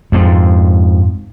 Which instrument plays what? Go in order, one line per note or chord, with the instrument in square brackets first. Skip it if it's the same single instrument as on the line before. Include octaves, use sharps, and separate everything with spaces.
[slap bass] F2 G#2